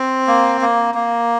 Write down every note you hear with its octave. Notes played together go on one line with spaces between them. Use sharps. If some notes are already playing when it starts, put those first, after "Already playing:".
Already playing: C4
A#3
A#3
A#3